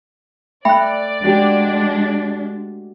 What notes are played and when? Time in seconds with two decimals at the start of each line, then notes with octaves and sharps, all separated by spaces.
0.65 A3 D5 E5 G5 B5 F#6
1.24 G#3 D4 F#4 G4